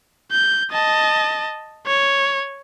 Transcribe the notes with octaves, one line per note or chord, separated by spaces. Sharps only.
G6
D#5 A5
C#5